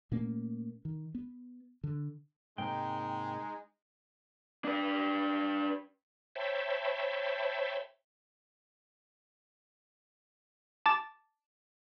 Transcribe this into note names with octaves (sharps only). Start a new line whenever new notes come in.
A#2 A3 A#3 C#4
D#3
B3
D3
G#2 C3 G#3 A#3 D#4 G5
D4 B4
C5 C#5 E5 G5 A5 B5
A5 D6 A6